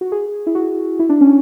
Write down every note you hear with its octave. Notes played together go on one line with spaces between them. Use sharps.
F#4
G#4
E4
F#4
E4
D4
C#4